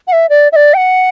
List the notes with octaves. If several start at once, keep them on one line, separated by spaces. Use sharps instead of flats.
F#5
E5
D5
E5
D5
G5
F#5